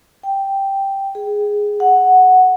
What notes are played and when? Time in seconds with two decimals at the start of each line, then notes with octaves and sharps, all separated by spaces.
0.23 G5
1.15 G#4
1.80 F#5